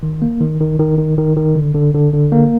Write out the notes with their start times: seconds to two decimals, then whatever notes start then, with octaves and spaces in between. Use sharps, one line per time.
0.03 D#3
0.22 A#3
0.41 D#3
0.60 D#3
0.79 D#3
0.98 D#3
1.18 D#3
1.36 D#3
1.56 D3
1.75 D3
1.94 D3
2.13 D3
2.32 A#3